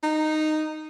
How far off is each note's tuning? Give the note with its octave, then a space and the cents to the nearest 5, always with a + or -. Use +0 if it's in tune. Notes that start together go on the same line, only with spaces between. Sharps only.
D#4 -10